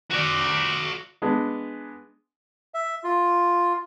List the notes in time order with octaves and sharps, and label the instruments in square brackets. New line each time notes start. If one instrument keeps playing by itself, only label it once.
[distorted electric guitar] F#4 D5
[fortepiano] G#3 B3 D4
[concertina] E5
F4